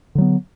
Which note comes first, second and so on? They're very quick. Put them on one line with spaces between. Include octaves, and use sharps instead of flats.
D3 F#3 B3